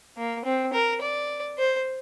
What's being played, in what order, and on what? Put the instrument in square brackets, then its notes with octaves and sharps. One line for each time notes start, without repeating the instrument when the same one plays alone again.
[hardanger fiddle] A#3
C4
A#4
D5
C5